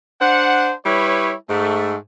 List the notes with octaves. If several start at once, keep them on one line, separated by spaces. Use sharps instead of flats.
D4 C5 F#5
G3 E4 B4 C#5
G#2 A3